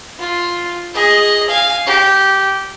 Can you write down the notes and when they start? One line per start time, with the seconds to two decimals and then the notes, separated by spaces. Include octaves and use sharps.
0.19 F4
0.94 G#4 D#5
1.49 F5 G#5
1.86 G4